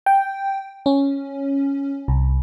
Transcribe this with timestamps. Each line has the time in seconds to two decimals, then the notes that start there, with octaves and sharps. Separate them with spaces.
0.06 G5
0.86 C#4
2.08 C2